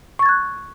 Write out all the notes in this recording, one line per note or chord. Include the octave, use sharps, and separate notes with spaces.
C#6 F#6 G#6 A6